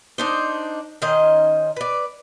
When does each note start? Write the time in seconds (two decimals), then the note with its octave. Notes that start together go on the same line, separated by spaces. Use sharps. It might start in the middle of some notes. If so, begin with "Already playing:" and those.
0.18 D4 D#4 C5
1.02 D#3 C#4 C5 D#5
1.76 B4 D5